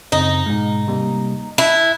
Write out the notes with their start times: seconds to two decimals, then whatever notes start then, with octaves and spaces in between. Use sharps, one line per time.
0.12 F#2 C#3 C4 D#4
0.46 G#2 B2 G#3
0.88 C3 G3 A#3
1.58 E4 A5 F#6 B6